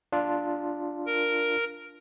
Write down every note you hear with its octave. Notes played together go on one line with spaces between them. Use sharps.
D4 F4
A#4